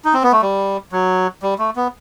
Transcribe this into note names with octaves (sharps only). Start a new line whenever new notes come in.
D#4
C4
B3
A3
G3
F#3
G3
A3
B3